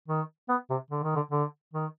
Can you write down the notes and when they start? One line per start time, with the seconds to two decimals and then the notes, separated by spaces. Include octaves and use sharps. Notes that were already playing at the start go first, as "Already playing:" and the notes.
0.08 D#3
0.49 B3
0.70 C3
0.90 D3
1.03 D#3
1.16 D3
1.31 D3
1.73 D#3